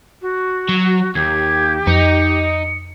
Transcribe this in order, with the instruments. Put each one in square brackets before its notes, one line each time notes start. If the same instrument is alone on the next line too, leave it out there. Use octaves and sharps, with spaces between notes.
[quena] F#4
[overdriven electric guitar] F#3
[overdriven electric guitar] D#2 [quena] G4 [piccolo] G#6
[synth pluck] F2 [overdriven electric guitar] D#4 [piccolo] C#7